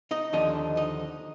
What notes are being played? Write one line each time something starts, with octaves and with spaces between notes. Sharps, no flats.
D#4 D#5
D#2 D3 F3 D#4 D#5
D#4 D#5